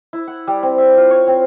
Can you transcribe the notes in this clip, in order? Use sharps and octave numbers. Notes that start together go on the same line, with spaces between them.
E4
F#5
G3
C4
E5
F4
C#5
C4